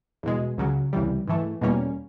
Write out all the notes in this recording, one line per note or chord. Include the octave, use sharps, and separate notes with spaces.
E2 B2 G#3
C#2 C#3 F#3
C#2 C3 E3 G3
G#2 E3 A3
E2 B2 G3 A#3 C#4